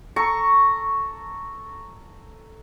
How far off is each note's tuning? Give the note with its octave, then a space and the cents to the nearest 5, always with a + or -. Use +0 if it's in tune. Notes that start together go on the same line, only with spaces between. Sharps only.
A4 +0 A#5 -10 C#6 +0